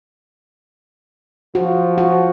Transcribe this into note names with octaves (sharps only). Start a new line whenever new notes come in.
F3 F#4
F#4